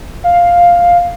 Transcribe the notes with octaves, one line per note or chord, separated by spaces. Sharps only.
F5